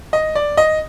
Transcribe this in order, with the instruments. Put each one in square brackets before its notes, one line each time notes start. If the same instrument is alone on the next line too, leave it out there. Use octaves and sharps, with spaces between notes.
[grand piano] D#5
D5
D#5